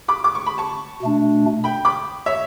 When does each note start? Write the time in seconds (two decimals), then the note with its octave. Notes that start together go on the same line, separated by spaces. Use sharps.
0.08 B5 D6
0.24 D6
0.35 C#6
0.47 B5
0.58 A5 C#6
1.02 B2 A3 D4
1.64 G5 B5
1.85 B5 D6
2.26 C#5 E5